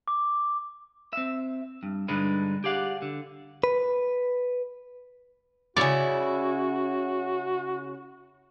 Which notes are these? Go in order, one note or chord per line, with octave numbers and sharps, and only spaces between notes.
D6
C4 E5
G2
G2 D3 G#3 D4 D#4 B4
G4 G#4 D5 F5 F#5
D3
B4
C#3 E4 F#4 C#5 D5